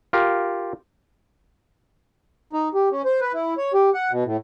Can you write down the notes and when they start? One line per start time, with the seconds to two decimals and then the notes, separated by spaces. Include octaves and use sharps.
0.13 F4 G4 A#4
2.53 D#4
2.74 G4
2.91 C#4
3.05 C5
3.21 B4
3.33 E4
3.58 C#5
3.74 G4
3.94 F#5
4.11 B2
4.24 A2